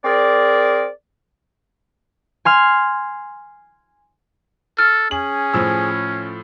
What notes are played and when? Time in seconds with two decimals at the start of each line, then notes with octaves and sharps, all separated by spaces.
0.05 C4 G#4 A#4 D5
2.45 G#5 C6 F6
4.79 A4 F6
5.11 C#4 G#4 F#7
5.54 A2 F3 E6